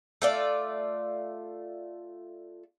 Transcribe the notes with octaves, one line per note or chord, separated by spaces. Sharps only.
A3 F4 D5